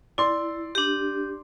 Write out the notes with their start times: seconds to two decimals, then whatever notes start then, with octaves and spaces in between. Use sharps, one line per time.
0.18 E4 D5 C6
0.75 D4 G4